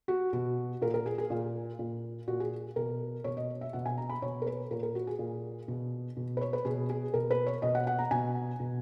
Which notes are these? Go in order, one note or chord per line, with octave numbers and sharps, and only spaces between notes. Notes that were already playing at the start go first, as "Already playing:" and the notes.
F#4
B2 F#4
A#2 A#4
A#4
G#4
G#4
A#2
A#2
A#2 F#4
G#4
B2 A#4
B2 C#5
D#5
E5
B2 F#5
G#5
A#5
B5
B2 C#5
A#4
B4
A#2 A#4
A#4
F#4
G#4
A#2
B2
B2
B4
C#5
B4
B2 G#4
G#4
B2 A#4
B4
C#5
B2 D#5
F#5
F#5
A#5
B2 G#5
B2